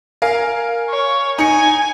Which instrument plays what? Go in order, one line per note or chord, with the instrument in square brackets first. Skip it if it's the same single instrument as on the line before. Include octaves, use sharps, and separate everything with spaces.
[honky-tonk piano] A#4 F5 G#5
[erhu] C#5
[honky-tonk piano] D#4 C#7 [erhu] G#5